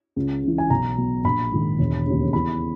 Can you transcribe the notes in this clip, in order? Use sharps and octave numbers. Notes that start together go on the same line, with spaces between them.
C#2
C#3 E3
G#5
B1 A#5
B2 F#3
A#1 B5
G#2 D#3
E1
D#2 C#3
E2 B5